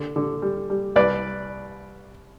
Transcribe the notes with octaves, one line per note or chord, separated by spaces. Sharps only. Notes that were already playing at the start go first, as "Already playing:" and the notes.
Already playing: D3
D3
G3
G3
C2 B4 D5